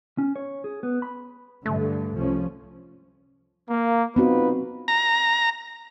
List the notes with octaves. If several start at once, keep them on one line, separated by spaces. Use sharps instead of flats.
C#4
C#5
G#4
B3
B5
G2 D3 A3
C2 F3 C#4
A#3
B3 C4 D#4 F4 F#4 B4
A#5